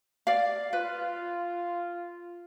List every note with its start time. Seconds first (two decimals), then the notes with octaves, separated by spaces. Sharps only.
0.27 D5 F5
0.73 F4 B4